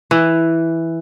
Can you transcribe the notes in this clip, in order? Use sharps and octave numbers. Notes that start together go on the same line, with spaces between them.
E3